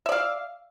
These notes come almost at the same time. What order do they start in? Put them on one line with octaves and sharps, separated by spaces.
E5 D5 F5